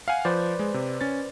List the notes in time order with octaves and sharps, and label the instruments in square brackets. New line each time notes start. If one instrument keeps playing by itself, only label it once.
[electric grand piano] F5 F#5 G#5
[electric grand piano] F3 [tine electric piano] B4 C5 D5
[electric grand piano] G#3
C3
C#4 A6